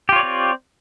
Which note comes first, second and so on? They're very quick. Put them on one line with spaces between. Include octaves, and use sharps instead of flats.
G4 F4 C#5 D5 C4